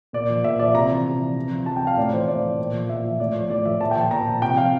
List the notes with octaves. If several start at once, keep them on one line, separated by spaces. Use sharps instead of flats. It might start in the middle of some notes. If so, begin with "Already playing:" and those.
A#2 D5
F3
A#2 E5
F3 D5
C3 A#5
E3
C3
E3
C3
F3
C3 A5
G5
F3
F5
A2 D5
E3 C5
A2 D5
E3
A#2
F3
A#2 E5
F3
A2 D5
F3
A2 D5
F3 E5
A#2 A5
G5
F3
A5
A#2 A#5
F3
C3 G5
F3 F5